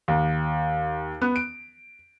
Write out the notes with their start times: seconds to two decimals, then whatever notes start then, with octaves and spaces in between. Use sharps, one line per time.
0.08 D#2
1.22 B3
1.36 D7